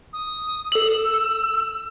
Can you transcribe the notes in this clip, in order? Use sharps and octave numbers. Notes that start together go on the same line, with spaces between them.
D#6
A4 E6 F#7